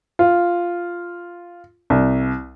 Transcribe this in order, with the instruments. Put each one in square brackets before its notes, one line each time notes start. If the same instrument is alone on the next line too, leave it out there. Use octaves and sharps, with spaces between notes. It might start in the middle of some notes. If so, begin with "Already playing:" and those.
[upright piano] F4
C2